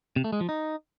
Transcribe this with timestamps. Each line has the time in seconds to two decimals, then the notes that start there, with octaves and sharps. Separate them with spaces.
0.16 C3
0.24 A3
0.33 G#3
0.41 F3
0.49 D#4